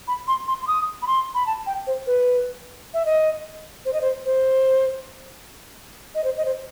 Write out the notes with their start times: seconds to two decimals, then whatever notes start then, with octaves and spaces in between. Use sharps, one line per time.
0.08 B5
0.28 C6
0.48 C6
0.62 C6
0.68 D#6
1.02 B5
1.07 C6
1.35 B5
1.47 A5
1.66 G5
1.87 C5
2.07 B4
2.94 E5
3.05 D#5
3.86 C5
3.93 D#5
4.01 C5
4.25 C5
6.15 D#5
6.24 C5
6.37 D#5
6.45 C5